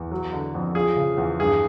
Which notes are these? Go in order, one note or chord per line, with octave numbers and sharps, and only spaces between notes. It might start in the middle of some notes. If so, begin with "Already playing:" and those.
Already playing: E2
F#3
D3
F2
F3 G#4
C#3
E2
G2 G#4